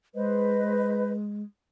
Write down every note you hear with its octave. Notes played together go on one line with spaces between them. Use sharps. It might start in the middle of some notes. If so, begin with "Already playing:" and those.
G#3 B4 C5 D#5